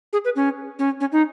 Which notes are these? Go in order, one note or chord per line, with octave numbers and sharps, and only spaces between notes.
G#4
B4
C#4
C#4
C#4
D#4